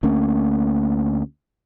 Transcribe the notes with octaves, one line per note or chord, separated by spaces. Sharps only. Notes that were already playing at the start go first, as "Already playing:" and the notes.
D2 A3 A#3 C#4